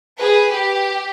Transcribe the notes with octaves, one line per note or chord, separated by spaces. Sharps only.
G#4 B4
G4